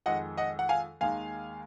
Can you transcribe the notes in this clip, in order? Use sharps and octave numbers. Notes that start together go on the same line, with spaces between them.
F2 D#3 G#3 D#5 F#5
D#5 F#5
F#5
F5 G#5
D#2 D#3 G#3 F5 G#5